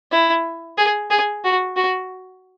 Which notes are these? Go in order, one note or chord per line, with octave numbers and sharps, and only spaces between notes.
E4
G#4
G#4
F#4
F#4